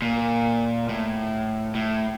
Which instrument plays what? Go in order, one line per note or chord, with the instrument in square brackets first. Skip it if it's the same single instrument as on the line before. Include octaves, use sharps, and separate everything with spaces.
[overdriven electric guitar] A#2
A2
A2